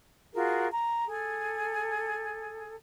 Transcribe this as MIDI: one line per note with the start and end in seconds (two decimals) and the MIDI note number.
0.33 0.67 65
0.33 0.67 66
0.33 0.67 68
0.33 0.67 70
0.71 1.05 82
1.06 2.74 68
1.06 2.74 69